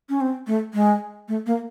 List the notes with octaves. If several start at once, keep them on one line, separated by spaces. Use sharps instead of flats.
C#4
C4
A3
G#3
A3
A#3